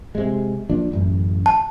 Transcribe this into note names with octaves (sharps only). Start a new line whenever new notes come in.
C3 G#3
F3 A#3 D4
A1 F#2
A5